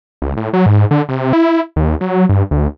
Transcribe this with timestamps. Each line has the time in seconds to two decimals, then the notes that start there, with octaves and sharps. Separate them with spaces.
0.22 C#2
0.37 A2
0.53 F#3
0.66 G#2
0.91 D3
1.09 C3
1.33 E4
1.76 D#2
2.01 F#3
2.29 G2
2.51 D2